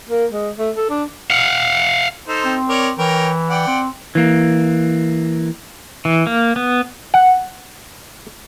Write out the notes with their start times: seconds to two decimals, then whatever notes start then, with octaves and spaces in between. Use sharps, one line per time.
0.09 A#3
0.31 G#3
0.58 A3
0.77 A4
0.90 D4
1.30 F5 F#5
2.28 D#4 A4 C5
2.45 C4
2.69 A#4 C#5 D5
2.98 E3 A#4 C#5 G5
3.49 D5 F#5 G5
3.67 C4
4.15 E3 A#3
6.05 E3
6.27 A#3
6.56 B3
7.14 F#5